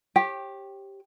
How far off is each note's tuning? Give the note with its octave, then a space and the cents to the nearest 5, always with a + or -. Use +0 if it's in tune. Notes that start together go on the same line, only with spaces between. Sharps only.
G4 +0 C#5 -40 G5 +0